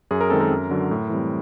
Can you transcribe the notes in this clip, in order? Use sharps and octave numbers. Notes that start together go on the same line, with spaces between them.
F#2 G#4
A#4
D#3 G#3 C4 A4
A#4
F#2
D3 F#3
A2
E3 G3 C4